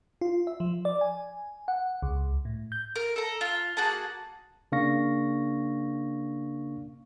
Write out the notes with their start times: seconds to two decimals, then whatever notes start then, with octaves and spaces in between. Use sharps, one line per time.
0.21 F4
0.47 E5
0.60 F3
0.85 D5
1.01 G#5
1.68 F#5
2.02 C#2
2.45 A2
2.72 G6
2.96 A#4
3.16 A4 A#5
3.41 F4
3.77 A#3 F#4 G#4 A5
4.72 C#3 A#3 D4 F5 C#6 A#6